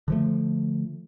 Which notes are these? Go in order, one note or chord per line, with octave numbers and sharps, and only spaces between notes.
D3 F3 A3